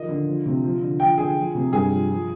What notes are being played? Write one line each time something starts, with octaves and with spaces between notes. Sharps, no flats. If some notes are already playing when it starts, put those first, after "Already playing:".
Already playing: D#3 F3 D#5
D3
F3
C3
F3
D3
F3 G5
D3 G#4
F3
C3
G2 G#4
F3
F3